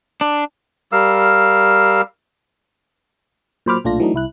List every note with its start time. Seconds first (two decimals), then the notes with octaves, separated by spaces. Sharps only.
0.21 D4
0.92 G3 A#4 F5 E6
3.66 A#2 F#3 C5 B5 D6 F6
3.84 B1 A#2 A3 D4 F4 A#6
4.00 E3 F#3 A3 D4 D#4
4.14 C2 E4 F#6